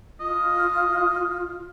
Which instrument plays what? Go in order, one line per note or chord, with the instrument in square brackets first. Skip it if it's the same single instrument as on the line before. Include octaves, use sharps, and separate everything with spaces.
[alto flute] F4 [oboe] D#5